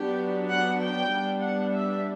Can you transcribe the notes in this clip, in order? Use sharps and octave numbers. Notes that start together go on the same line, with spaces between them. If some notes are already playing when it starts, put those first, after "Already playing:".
Already playing: F#3 B3 D4 G4
F#5
G5
G3 B3 D4
F#5
E5